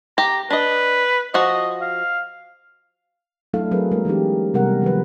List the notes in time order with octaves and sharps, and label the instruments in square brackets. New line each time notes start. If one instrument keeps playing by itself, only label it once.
[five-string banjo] G4 [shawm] A#5
[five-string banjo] D4 D#5 [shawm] B4
[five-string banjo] F3 F#4 [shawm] D#5
[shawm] F5
[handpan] F#3 A3 D4 E4 A4 F5
F#3 C4 G#4 A#4 B4
G#3 A#3 A#4
E3 C#4 D#4 G4
C3 G3 B3 A#4 F#5
D#3 F3 B4